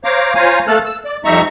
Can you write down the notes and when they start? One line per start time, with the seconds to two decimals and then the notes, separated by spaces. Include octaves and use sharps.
0.04 C5 C#5 F5 A#5 D6
0.35 F4 C5 C#5 F5 G#5 A#5
0.68 A3 A#3 A4 A5 F6 F#6
0.85 E6
1.05 D5
1.25 F2 G3 D#4 E5 A#5 C#6